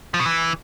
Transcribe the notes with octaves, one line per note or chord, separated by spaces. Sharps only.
F3
B2
E3